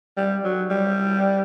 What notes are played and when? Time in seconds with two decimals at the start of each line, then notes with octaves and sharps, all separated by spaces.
0.17 G3
0.44 F#3
0.70 G3